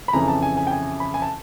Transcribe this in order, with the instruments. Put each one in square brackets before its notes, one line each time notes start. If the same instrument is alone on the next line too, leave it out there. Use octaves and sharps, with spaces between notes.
[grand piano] B5
F2 C#3 E3 A#5
A5
G#5
G#5
G5
G#5
B5
G#5
A5